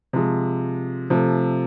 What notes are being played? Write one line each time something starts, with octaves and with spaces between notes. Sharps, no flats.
C3 F3 G#3
C3 F3 A3